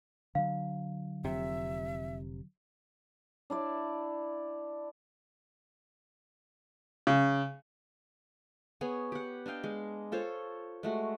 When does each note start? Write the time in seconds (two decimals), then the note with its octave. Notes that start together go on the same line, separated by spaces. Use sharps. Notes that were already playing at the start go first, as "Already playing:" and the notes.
0.35 D3 F#3 F5
1.24 F1 C3 E5
3.50 D4 E4 D5
7.07 C#3
8.81 B3 G#4 C#5
9.12 G4 F#5
9.46 D4 D#5 F5 G5
9.64 G#3
10.12 F4 A4 C5 C#5
10.83 G#3 A3 F#4